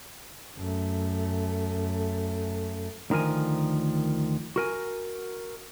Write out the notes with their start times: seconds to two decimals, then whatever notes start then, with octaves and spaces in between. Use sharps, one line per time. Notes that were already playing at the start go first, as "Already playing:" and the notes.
0.57 F#2 A3
3.10 D2 D#3 F3 A#4 G#5
4.56 F#4 A#4 G#5